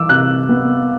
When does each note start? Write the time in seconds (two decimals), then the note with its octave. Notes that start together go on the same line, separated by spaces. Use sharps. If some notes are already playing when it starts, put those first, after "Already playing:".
Already playing: E3 D6 E6
0.09 C3 F#6
0.49 B3